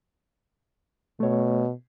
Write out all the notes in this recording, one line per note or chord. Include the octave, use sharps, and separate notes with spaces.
B2 A3 C#5